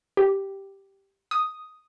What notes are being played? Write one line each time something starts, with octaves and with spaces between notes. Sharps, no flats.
G4
D#6